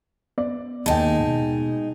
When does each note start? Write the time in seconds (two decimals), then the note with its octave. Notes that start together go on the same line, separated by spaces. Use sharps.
0.38 B3 D5
0.86 D#2 G#3 D#4 G5 A5
1.23 B2